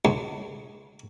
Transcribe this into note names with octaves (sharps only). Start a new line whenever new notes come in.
C#2